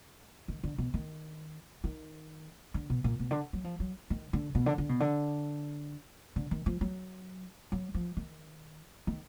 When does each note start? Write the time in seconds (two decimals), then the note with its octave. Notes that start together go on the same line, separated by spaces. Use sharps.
0.48 D#3
0.64 D3
0.78 B2
0.94 D#3
1.84 D#3
2.74 D3
2.90 B2
3.04 A#2
3.19 B2
3.31 D3
3.53 F#3
3.64 F3
3.80 F#3
4.10 D#3
4.33 D3
4.55 B2
4.66 D3
4.78 D3
4.89 B2
5.00 D3
6.36 D3
6.51 D#3
6.66 F3
6.81 F#3
7.72 F#3
7.95 F3
8.17 D#3
9.07 D#3